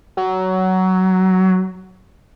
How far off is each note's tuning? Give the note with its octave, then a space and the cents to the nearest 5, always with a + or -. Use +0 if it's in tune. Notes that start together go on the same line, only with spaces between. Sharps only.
F#3 +15